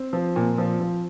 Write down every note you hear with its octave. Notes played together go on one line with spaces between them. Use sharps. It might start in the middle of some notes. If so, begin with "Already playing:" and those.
Already playing: C4
F3
A#2
F3
F3